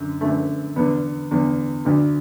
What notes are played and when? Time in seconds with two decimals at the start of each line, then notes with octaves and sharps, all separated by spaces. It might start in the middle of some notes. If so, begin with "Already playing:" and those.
Already playing: F#2 D3
0.21 F#2 D3 A3
0.76 E2 D3 B3
1.31 E2 D3
1.85 D2 D3